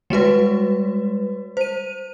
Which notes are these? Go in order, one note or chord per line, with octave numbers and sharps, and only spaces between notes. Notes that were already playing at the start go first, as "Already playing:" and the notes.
G3 G#3 F#4 B4
C5 D#7